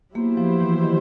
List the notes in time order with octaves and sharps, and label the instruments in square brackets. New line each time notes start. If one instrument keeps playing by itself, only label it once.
[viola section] F#3 B3 E4 G4 C5 [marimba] A#3
[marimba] F3
E3
D#3